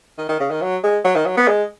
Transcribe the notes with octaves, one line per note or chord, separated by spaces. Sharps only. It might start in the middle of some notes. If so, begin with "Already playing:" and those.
D#3
D#3
C#3
D#3
F#3
G#3
F#3
D#3
F#3
B3
G#3